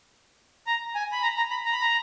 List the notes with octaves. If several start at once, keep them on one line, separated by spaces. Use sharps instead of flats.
A#5
G#5
B5
A#5
A#5
B5
A#5
B5
A#5